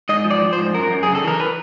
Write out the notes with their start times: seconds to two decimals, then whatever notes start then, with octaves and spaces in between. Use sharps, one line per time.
0.09 G#2 D#5
0.25 F3
0.30 D5
0.41 F3
0.53 C5
0.58 G#2
0.74 F#2 A#4
0.91 F#2
1.03 C#3 G#4
1.15 A4
1.24 E3 A#4
1.40 B4